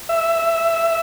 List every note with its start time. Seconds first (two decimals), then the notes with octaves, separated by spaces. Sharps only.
0.09 E5